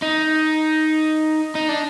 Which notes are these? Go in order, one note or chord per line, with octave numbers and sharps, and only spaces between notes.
D#4
D#4
D4